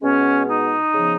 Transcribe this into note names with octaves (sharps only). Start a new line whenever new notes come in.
B2 G#3 B3 C#4
D#4
C#3 F3 B3